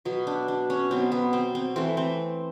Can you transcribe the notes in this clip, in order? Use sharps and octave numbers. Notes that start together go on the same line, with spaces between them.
B2 F#3 B3
D4
D4
C#4
B2 F#3 B3 C4
B3
C4
C4
E3 A3 C4
C4